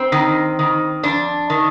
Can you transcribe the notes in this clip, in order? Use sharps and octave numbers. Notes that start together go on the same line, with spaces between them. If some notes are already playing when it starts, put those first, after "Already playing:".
Already playing: C4
D#3
D#3
F2 D4
D#3